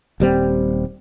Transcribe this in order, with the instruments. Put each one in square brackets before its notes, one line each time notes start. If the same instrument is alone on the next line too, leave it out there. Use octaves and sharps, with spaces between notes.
[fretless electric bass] D#1 G3 C4